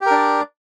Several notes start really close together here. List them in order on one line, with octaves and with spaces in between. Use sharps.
G4 A#4 D4 D5